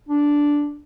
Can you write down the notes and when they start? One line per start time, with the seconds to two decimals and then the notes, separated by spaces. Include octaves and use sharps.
0.09 D4